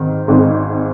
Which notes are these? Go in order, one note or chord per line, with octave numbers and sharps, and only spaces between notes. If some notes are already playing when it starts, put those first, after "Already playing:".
Already playing: G#1 G#2 D#3
G#1 G#2 D#3